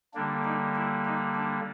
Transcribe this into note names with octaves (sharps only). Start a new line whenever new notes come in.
D3 G3 A#3 D4
D#4
E4
D#4
D4